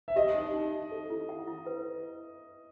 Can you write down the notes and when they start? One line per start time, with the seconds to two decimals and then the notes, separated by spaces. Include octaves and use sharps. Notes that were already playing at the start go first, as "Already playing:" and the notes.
0.08 E5
0.16 G4 D#5
0.35 D#4
0.54 D#4
0.73 D#4
0.92 A4
1.10 E4
1.29 F#5
1.47 E4
1.66 B4